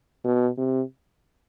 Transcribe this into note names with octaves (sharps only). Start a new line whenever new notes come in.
B2
C3